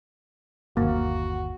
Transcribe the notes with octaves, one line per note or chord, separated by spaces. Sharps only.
G1 D#2 A#3 F#4